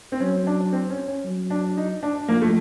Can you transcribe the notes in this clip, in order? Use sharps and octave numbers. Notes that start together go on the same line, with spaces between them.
C4
F#3 C#4
D4
C4
C#4
C#4
F#3
D4
D#4
D4
F3 A#3
A3